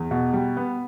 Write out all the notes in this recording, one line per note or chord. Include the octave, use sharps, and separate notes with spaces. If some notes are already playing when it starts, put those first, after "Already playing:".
Already playing: E2
B2
G3
B3